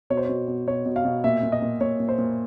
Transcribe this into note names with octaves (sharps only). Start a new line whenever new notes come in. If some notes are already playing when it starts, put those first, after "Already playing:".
B2 C#5
C5
B2 C#5
B2
B2 C#5
B2
F5
B2
A#2 E5
A#2
D#5
A#2
A#2 C#5
A#2
C5
A#2